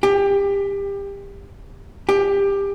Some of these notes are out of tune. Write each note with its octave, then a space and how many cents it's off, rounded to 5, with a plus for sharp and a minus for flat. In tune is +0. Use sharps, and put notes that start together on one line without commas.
G4 +25
G4 +20